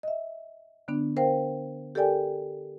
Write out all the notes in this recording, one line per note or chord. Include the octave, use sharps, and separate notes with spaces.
D#5 E5
D3 B3 D4
A#4 C5 F5 G5
G4 A4 A#4 D5 G5 G#5